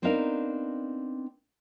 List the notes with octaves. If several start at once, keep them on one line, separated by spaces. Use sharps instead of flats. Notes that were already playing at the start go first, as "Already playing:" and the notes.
B3 C4 D4 D#4 A#4 F5